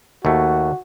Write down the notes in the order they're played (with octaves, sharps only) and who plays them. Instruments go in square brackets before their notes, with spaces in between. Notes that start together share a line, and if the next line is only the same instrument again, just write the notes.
[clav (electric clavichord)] D#2 A3 [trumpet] F#4